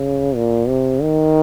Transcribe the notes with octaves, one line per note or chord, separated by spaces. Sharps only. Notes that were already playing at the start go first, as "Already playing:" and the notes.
Already playing: C#3
A#2
C3
D#3